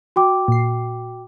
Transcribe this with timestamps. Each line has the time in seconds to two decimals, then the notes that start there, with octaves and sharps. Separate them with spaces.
0.16 F#4 G5 D6
0.48 A#2 C7